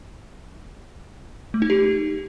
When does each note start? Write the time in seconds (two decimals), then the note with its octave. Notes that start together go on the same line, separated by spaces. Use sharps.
1.54 A3
1.62 D#4
1.70 G4